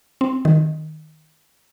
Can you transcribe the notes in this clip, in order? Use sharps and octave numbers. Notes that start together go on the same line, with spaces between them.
C4
D#3